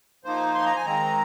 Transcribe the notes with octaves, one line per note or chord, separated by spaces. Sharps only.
F3 A#3 D#4 C5
C6
A#5
G#5
D#3 G#3 C4 A#5